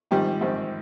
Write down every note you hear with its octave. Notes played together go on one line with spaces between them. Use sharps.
A#1 G#2 D#3 G3 C4 G4
A#1 G#2 D#3 G3 C4